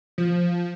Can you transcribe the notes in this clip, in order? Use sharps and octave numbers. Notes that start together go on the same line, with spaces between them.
F3